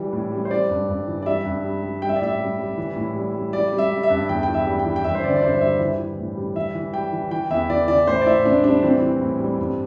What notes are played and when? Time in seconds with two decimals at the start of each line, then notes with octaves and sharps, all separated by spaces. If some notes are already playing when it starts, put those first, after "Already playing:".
Already playing: E3 G3
0.13 A2
0.32 G3
0.45 C5
0.51 G3 D5
0.69 G2
0.89 G2
1.08 E3
1.22 D5
1.26 G3 E5
1.45 G2
1.64 G3
1.83 G3
2.02 G3 G5
2.09 E5
2.16 D5
2.21 A2 E5
2.40 G3
2.59 G3
2.78 E3
2.96 A2
3.15 G3
3.34 G3
3.53 G3 D5
3.72 G3
3.78 E5
3.91 G3
4.03 E5
4.10 G2
4.29 E2 G5
4.43 G5
4.48 E3
4.54 E5
4.67 G3
4.79 G5
4.86 E3
4.96 G5
5.04 G2 E5
5.15 C5
5.24 D3 D5
5.36 D5
5.42 G2 C5
5.61 G3 E5
5.80 E3
5.99 E3
6.18 A2
6.37 G3
6.56 E3 E5
6.75 E3
6.93 G3 G5
7.13 E3
7.31 E3 G5
7.50 E2 E5
7.69 E3 D5
7.88 E3 D5
8.07 A2 C5
8.21 D5
8.26 A2 E5
8.45 A2 D4
8.64 G3 D4
8.83 E3 C4
9.02 E3
9.21 A2
9.39 G3
9.59 G2